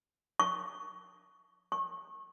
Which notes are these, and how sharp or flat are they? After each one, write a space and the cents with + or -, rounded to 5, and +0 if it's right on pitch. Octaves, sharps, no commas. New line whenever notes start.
C#6 +10
C#6 -30